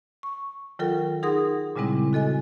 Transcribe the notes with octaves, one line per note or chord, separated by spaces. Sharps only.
C#6
D#3 F#3 F4 A4 A#4 G5
D#4 G#4 A#4 F#5 C6 D#6
A#2 C#3 G3 G#3 C4 E4
F#4 A4 D#5 G#5